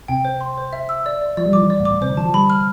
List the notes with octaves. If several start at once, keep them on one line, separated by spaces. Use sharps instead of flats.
C3 G5
C5
C6
C5
E5
E6
D5
D5
F3 D5
G3
F3 D6
E3
D5
A2
D6
A2
C3 C5
D3
E3 A5
F3
G3 B5
F6